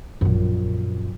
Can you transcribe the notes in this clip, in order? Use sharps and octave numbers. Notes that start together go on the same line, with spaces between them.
A#1 F#2